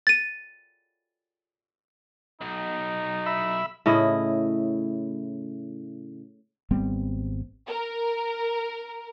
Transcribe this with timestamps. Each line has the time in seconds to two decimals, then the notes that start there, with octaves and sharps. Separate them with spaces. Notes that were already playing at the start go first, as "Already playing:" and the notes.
0.07 A6 D#7
2.41 B1 D#4
3.26 E5 B5
3.86 A2 C#3 E4 D#5
6.71 G#1 G3 B3 C4
7.67 A#4